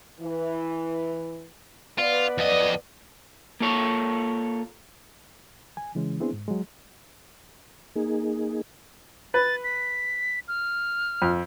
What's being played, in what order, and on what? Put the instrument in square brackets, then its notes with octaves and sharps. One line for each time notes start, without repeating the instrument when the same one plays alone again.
[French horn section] E3
[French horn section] B3 B4 D5 [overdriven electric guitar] F4
[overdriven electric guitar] F2 D#5
[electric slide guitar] A#3 F4 A4 C#5
[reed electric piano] G#5
C#3 E3 G#3 C#4
B3 C4 D4 E4 G#4 C5
G#2
F#3 G#3
[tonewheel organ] A#3 D#4 G#4
[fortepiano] B4 [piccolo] A6
[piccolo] B6
F6
[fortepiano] F2